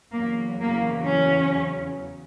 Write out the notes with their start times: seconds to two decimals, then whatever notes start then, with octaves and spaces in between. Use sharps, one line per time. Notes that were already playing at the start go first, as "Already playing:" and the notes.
0.13 E2 C#3 F#3 A#3
0.60 A#3
1.06 C#4